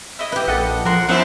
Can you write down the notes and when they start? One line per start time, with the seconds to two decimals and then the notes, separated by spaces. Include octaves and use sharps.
0.19 E4 D#5
0.32 G4 B4
0.48 A#1 A4 D#5 F#5
0.85 F3 A#4 F#5 C6
1.08 F#2 B3 C4 E4 D5 E5